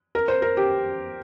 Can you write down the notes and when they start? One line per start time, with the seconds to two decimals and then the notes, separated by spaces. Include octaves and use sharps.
0.15 A#4
0.28 C5
0.42 A#4
0.57 G4